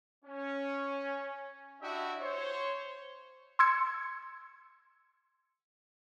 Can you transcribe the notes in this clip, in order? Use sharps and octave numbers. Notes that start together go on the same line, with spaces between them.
C#4
D4 E4 F#4 G4 D#5 E5
C5 C#5
C6 E6 G#6 C#7